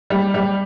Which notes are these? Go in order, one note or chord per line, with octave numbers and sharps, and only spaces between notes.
G3
G3